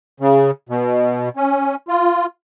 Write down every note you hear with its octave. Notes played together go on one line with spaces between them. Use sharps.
C#3
B2
C#4
F4